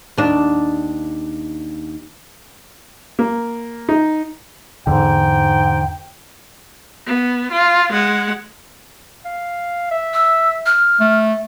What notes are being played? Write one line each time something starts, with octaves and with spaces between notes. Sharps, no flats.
D#2 D4
A#3
D#4
E2 G#2 D3 G5
B3
F4
G#3 F#5
F5
E5
E6
F6
A3